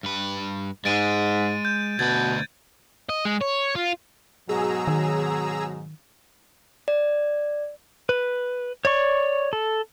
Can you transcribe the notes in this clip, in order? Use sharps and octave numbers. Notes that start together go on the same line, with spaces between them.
G2 B4
G#2 G#3 A6 D7 D#7
G6
D2 B2 B4 G#6 A6
D#5
G#3
C#5
F4
G#2 B2 F#3 G#4 A#5 E6
D#3
D5
B4
C#5 D5 C#6
A4